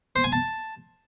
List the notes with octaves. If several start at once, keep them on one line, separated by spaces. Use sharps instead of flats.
C5
G#5
A5